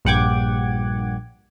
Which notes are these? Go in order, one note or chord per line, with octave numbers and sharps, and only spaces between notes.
A#1 G2 F#5 G5 D6 G#6